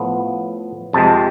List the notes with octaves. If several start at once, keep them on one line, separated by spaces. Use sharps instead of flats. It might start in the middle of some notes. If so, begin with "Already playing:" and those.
Already playing: A2 F3 B3
F2 C3 G#3 A5